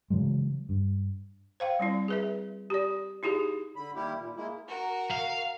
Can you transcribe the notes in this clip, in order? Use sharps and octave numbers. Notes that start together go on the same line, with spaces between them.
C#3 E3 F#3 G#3
G2
C5 F5 G5
G3 C4 E4
G#4 B4 E5
G4 D5
D#4 E4 G4 G#4
D3 B5
D#3 G3 A#3 E4 G4
A#2
G#3 A#3 E4
F#4 A#4
F5